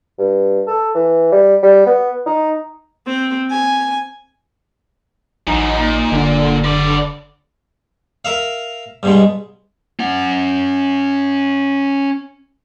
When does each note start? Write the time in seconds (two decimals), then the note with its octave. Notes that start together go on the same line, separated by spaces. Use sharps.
0.19 G2
0.67 A4
0.95 E3
1.32 G3
1.63 G3
1.86 B3
2.26 D#4
3.07 C4
3.51 G#5
5.47 A1 E3 F#3 D#4
5.79 A#2
6.12 F#1 D3
6.64 B4 D5
8.25 A#4 E5 F5
9.03 G2 B2 G#3
9.99 C#4 F#5